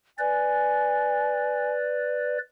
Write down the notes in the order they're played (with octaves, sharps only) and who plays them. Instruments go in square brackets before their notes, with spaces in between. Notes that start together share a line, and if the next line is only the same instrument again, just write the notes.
[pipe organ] B4 D5 [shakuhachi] G#5